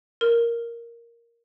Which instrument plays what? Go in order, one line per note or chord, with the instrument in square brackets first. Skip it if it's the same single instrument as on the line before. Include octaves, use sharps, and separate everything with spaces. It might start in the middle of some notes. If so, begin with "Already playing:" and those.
[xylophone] A#4